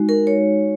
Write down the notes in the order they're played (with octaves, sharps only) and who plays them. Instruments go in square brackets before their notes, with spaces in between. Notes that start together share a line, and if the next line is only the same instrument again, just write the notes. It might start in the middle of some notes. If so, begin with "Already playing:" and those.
Already playing: [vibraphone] G#3 D#4 F#4
A#4
C#5